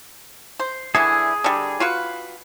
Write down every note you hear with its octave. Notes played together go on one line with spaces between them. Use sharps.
C5
D3 E3 E4 G#4
D3 G3
F4 F#4 B4